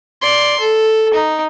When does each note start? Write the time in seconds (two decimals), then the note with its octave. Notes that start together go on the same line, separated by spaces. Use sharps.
0.22 D5 C6
0.60 A4
1.14 D#4